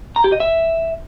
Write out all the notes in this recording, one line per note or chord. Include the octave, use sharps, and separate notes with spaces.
A#5
G4
D#5
E5